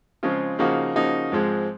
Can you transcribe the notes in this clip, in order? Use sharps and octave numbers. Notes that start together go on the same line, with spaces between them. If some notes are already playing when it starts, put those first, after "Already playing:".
C#3 F3 G#3 C4 F4
C#3 F3 A#3 D#4 F#4
C#3 F3 A#3 D#4 F#4
G#2 F3 G#3 C4